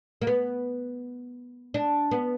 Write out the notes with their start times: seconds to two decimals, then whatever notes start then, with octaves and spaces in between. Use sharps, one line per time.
0.22 A#3
0.27 B3
1.74 D4
2.11 B3